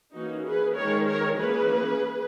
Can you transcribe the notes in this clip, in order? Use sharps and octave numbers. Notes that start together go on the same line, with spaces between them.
E3 A#3 C#4 D#4 F#4
G#4 B4
D#3 G#3 C#4 A#4 C#5
A#4 C#5
E3 A#3 C#4 G#4 B4